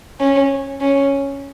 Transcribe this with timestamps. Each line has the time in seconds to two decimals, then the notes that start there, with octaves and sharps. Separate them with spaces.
0.20 C#4
0.81 C#4